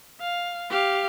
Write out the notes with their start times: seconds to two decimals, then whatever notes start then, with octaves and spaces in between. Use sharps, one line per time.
0.21 F5
0.70 G4 F5